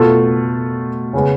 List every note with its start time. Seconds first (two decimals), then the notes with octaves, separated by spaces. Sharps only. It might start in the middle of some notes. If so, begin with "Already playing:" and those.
Already playing: B2 A3 F4 A4
1.13 C#3 G#3 B3